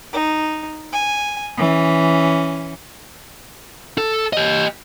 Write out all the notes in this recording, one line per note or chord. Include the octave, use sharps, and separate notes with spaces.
D#4
G#5
E3 C#4
A4
G4 D#5